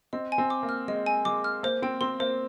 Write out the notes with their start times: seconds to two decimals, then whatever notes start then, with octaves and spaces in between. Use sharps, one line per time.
0.13 C4 D#5
0.32 G#5
0.38 C4
0.50 D6
0.63 A#3
0.69 F6
0.88 G#3 D#5
1.06 G#5
1.25 G#3 D6
1.44 F6
1.63 A#3 C5
1.82 C4 G5
2.01 C4 C6
2.20 A#3 C5